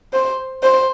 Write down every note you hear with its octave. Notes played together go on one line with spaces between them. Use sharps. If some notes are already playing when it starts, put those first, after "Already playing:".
C5
C5